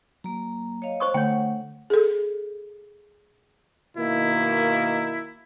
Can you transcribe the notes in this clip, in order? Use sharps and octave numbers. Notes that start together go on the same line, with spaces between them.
F#3 A#3 A#5
C#5 D#5 F5
C5 C#6 D#6
D3 A3 C#5 F#5 G5
G#4 A4
B2 D#3 A#3 E4